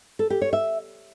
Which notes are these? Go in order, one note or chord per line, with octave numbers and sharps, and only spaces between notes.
A4
G4
C#5
E5